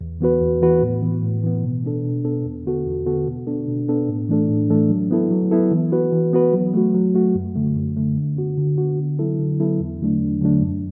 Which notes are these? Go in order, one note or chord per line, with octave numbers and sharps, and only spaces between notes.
E2
E3 B3 F#4 B4
E2
E3 B3 F#4 B4
A2
E3 B3
A2
E3 B3
B2
B3 D4 A4
B2
B3 D4 A4
E2
D3 B3 F#4 A4
E2
D3 B3 F#4 A4
B2
B3 D4 A4
B2
B3 D4 A4
A2
E3 A3 D4 A4
A2
E3 A3 D4 A4
F#3
B3 E4 A4
F#3
B3 E4 A4
E3
B3 F#4 B4
E3
B3 F#4 B4
F#3
A3 F#4
F#3
A3 F#4
F#2
D3 A3
F#2
D3 A3
D3
B3 F#4
D3
B3 F#4
D3
F#3 B3 E4 A4
D3
F#3 B3 E4 A4
E2
D3 F#3 A3 D4
E2
D3 F#3 A3 D4
F#2